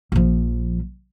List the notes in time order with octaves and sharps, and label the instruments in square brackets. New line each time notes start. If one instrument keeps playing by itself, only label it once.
[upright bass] A#1 F3